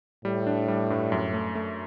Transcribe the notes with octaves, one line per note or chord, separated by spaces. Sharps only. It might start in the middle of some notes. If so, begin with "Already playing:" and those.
A2 G3
D4
G3
G2
F#2
A3
A3